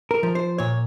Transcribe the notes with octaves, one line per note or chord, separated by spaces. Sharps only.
A#4
F3
C5
A#2 C#5